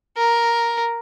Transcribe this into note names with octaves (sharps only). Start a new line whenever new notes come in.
A#4